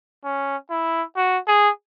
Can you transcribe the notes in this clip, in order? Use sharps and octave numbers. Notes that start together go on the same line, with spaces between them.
C#4
E4
F#4
G#4